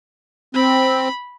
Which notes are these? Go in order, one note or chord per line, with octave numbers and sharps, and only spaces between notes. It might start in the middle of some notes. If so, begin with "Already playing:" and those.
C4 B5